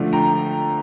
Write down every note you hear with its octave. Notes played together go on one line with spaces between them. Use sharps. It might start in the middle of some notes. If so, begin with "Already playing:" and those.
Already playing: D3 F3 A3 D4
G5 A#5